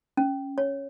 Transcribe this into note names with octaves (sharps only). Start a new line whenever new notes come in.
C#4
C#5